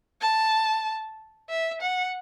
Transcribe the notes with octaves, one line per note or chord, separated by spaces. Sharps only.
A5
E5
F#5